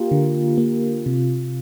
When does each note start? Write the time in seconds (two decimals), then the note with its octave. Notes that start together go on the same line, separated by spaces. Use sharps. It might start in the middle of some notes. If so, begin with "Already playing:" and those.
Already playing: A#3 F4 G4 A#4
0.11 D3
0.58 A#3
1.06 C3